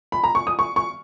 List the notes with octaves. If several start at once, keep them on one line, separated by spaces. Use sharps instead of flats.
B5
A#5
C#6
D#6
C#6
C#6